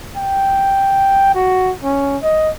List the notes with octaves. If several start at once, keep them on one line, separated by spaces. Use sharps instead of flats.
G5
F#4
C#4
D#5